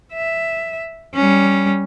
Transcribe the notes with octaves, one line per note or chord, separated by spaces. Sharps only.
E5
G3 C#4